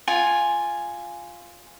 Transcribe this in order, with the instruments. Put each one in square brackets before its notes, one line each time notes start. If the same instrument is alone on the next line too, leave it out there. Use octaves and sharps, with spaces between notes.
[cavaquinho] F4 G#5